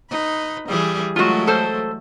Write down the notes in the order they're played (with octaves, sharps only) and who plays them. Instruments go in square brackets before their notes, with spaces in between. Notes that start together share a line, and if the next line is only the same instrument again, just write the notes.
[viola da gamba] D#4 B4
E3 G3 G#4
[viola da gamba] F#3 G#3 A3 [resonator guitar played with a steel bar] F4 F#4
[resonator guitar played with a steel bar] A4 C5